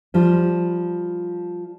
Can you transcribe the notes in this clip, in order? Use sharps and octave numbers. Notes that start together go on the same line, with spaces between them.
F3 G3